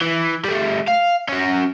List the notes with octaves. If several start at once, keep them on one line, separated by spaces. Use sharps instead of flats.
E3
G3 A3
F5
C#4 F#4